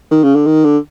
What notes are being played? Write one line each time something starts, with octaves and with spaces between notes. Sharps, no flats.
D#3
C#3
D3
D#3
D3